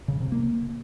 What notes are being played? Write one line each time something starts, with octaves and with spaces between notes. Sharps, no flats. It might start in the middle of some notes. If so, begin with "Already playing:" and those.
C#3
C3
A#3